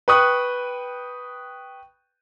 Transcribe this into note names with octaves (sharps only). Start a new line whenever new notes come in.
B4 G5 C#6 D#6 F#6